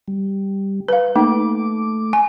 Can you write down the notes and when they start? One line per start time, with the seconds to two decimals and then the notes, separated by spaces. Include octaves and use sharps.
0.08 G3
0.89 B4 F5
1.16 A3 A#3 D#4 D6
2.13 G#5